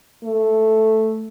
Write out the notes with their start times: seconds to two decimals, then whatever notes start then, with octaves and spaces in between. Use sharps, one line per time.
0.23 A3